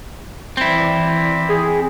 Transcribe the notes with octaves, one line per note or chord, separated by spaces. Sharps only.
E3 C4 E4 D5
G#4